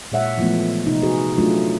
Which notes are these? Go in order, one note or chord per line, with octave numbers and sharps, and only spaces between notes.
A#2 G#3 C#5 E5 F#5
E3 F3 G#3 A3 B3
C3 D#4
F#4 G#4 B4
F#3 A3 D4 F4